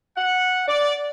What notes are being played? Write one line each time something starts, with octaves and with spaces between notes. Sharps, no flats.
F#5
D5